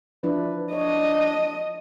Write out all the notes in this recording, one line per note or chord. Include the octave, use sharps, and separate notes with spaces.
F3 D4 E4 B4
D4 C#5 D#5